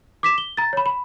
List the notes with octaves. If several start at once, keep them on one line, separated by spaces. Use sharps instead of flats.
D6 B6 E7
G7
A#5 A6
C#5 B5
B5